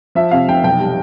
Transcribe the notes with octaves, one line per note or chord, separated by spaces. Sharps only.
F3 E5
C3 F5
F1 G5
B1 G5
G3